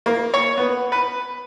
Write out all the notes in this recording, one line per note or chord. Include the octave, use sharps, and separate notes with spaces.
A#3
C#5
B3
B4